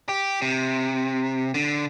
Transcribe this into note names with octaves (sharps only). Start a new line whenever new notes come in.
G4
C3
D3